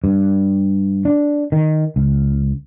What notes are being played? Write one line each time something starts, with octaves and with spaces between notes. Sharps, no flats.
G2
D4
D#3
C#2